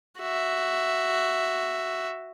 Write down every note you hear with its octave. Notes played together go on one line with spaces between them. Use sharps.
F#4 E5